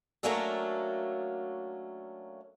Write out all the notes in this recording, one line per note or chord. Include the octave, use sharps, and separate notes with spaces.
F#3 A3 A#3 C#4 D4 A4